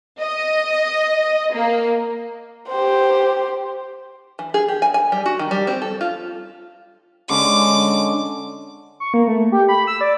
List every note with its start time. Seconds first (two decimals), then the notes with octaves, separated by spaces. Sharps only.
0.20 D#5
1.54 A#3
2.69 G4 C5
4.39 E3
4.54 G#4
4.68 G4
4.82 G#5
4.94 G#5
5.12 G3
5.26 F#4
5.39 D#3
5.51 G3
5.67 C4
5.82 A4
6.01 F4
7.30 D3 G#3 C#4 D6
9.00 C#6
9.14 A#3
9.28 A3
9.52 G4
9.69 B5
9.87 E6
10.01 D5